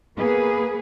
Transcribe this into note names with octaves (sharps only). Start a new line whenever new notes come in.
A#3 B3 G#4 B4